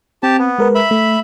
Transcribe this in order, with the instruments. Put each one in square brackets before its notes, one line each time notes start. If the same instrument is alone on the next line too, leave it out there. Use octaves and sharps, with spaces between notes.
[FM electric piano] C4 [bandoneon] G4 A5
[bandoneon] B3
[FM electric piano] G#3 A#4 B4
[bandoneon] E5 B5
[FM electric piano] A3